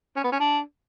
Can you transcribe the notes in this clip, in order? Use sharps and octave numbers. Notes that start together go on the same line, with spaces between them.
C#4
B3
C#4
D4